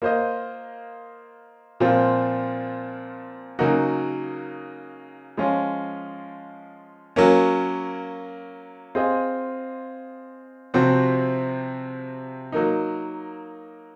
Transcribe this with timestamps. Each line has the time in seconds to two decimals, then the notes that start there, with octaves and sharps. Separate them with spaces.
0.02 A#3 F4 C5 D#5
1.80 A#2 F3 C4 F4
3.59 C#3 F#3 A#3 D#4 F#4
5.37 F3 G#3 C#4 F4
7.16 F#3 A#3 C#4
8.95 C4 F4 G#4 D#5
10.74 C3 F3 C4 F#4
12.52 F#3 A#3 D#4